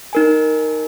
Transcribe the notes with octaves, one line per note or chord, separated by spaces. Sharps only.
D#4 A#4 G#5